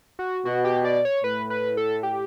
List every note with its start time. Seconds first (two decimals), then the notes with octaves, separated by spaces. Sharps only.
0.19 F#4
0.45 B2 F#4
0.65 G4
0.84 D5
1.05 C#5
1.24 A2 B4
1.50 B4
1.77 A4
2.03 G4